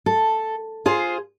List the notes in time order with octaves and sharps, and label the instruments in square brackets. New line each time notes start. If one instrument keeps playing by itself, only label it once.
[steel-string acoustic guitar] A4
F4 G#4 C5